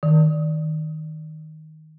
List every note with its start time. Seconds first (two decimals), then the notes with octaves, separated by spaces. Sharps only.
0.03 D#3